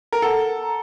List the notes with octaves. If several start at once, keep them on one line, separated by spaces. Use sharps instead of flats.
A#4
A4 F#5
A#5